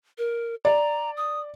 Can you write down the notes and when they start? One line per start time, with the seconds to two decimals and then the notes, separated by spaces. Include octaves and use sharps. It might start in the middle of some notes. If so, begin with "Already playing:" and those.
0.18 A#4
0.65 D5 A#5
1.17 D#6